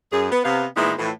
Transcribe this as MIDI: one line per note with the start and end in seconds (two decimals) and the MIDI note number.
0.12 0.27 42
0.12 0.27 68
0.31 0.42 59
0.43 0.65 48
0.43 0.65 59
0.43 0.65 77
0.76 0.93 46
0.76 0.93 52
0.76 0.93 56
0.76 0.93 59
0.76 0.93 63
0.76 0.93 64
0.98 1.10 45
0.98 1.10 52
0.98 1.10 53